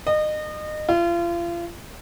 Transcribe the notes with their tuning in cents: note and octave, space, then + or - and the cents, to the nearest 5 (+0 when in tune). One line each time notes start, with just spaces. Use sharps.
D#5 -30
F4 -35